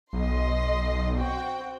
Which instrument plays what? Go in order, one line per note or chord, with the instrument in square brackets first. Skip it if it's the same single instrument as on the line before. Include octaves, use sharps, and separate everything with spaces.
[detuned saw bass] B1 [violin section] D#5 C6
[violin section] C4 F#4 G5